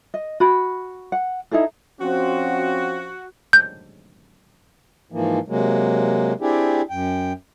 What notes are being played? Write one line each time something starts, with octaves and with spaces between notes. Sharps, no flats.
D#5
F#4 B5
F#5
D#4 E4 G#4 A4
F3 C4 C#4 F#4
G6
G#2 E3 F3 A#3
C3 F#3 G#3 A#3
C4 D4 E4 G4 G#4
F#2 G5